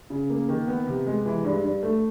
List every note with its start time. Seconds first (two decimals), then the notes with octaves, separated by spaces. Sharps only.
0.10 C#3
0.30 A#3
0.49 D#3
0.67 B3
0.87 C3
1.07 G#3
1.26 E3
1.44 G2
1.63 G2
1.83 A3